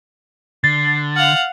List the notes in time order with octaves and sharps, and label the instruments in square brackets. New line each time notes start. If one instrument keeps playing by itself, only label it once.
[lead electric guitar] D3 [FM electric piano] A6 [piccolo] C7
[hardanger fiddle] F5 F#5 [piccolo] F6